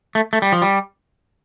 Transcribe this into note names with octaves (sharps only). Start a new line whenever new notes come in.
A3
A3
G3
F3
G3